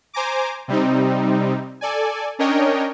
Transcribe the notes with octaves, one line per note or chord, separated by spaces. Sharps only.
C5 G#5 A#5 D6
C3 G3 C4 D#4
A4 D5 G#5
C#4 D4 A#4 C#5 D#5 G5